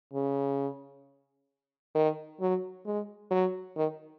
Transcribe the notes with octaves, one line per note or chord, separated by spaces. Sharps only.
C#3
D#3
F#3
G#3
F#3
D#3